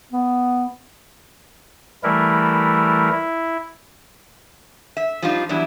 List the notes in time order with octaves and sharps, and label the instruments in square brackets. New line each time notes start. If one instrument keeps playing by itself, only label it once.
[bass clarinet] B3
[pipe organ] E3 G3 A3 E4 A#4
E4
[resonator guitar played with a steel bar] E5
F3 G3 D4 D#4 F4
E2 E3 F#3 G3 D4 E4